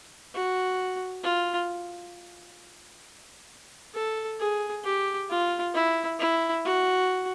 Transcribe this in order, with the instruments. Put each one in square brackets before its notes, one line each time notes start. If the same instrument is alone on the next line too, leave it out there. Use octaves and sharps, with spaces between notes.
[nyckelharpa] F#4
F4
A4
G#4
G4
F4
E4
E4
F#4